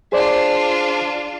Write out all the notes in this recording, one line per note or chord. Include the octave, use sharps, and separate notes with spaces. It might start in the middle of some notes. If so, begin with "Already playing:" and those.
D4 F4 G#4 C5 D5